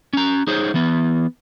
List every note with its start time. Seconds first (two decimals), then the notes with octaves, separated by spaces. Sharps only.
0.13 C#4 A#5
0.47 D#4 G#4 C5 C#5
0.74 E3 B3